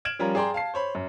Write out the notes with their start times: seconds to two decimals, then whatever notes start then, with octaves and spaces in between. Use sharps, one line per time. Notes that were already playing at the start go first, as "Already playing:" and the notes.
0.05 F6 G#6 D7 E7 F#7
0.19 F3 G3 C#4 F4 A#4
0.35 G#4 D5 G5 A#5 C6
0.54 F5 A5 C7
0.74 C5 C#5 B5
0.95 F#2